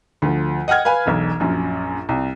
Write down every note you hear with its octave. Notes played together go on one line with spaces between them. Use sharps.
D2 F3
D#5 F#5 G5 F6 G#6
B4 F5 G#5 B5
E1 B1
A#1 F#2
C2